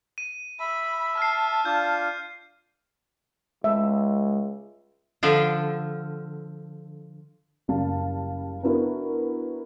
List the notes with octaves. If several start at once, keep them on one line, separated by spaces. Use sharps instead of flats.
D#7
E5 B5
A5 F6 C7
D4 F4 G6
C#2 G#3 E5
D3 F3 F4
F#1 C#3 G3 F5 A5
B3 D4 E4 F#4 A#4 B4